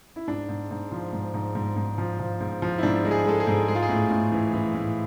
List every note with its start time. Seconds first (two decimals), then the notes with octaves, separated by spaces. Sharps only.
0.16 E4
0.28 G#2 D4
0.49 G#2
0.71 G#2
0.92 F3
1.13 G#2
1.34 G#2
1.55 G#2
1.77 G#2
1.98 F3
2.20 F3
2.41 G#2
2.62 F3
2.78 E4
2.83 G#2 D4
3.05 G#3
3.11 G#4
3.26 G#3 A4
3.40 G#4
3.47 G#2
3.68 G#3 G#4
3.75 F4
3.83 G#4
3.89 A2
4.11 A2
4.32 E3
4.53 E3
4.74 A2